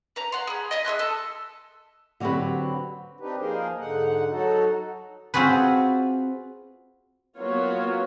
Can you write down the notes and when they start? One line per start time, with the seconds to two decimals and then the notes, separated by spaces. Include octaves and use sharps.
0.16 B4 A#5
0.32 F#5 C6
0.47 G#4 B5
0.71 D#5 G#5 B5 D#6
0.85 G#4 E5 C6 F#6
0.99 A4
2.20 D3 F#3 C4 F#4 G4 B4
3.20 C4 D4 D#4 G4 B4
3.39 F3 A#3 D#4 G#4 A#4 C5
3.79 G#2 D3 D#4 F#5
4.31 F#3 D#4 F#4 A4
5.34 C4 F4 F#4 G#4 B4
7.38 F#3 A#3 B3 F4 F#4 C#5